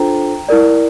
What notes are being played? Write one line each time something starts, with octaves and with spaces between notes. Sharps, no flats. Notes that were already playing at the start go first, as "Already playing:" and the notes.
Already playing: D4 F4 A4 C5 G5 A#5
E4 A#4 D5